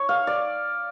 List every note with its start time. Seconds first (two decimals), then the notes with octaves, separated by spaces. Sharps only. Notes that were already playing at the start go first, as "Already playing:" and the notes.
Already playing: C#5
0.09 F5
0.27 D5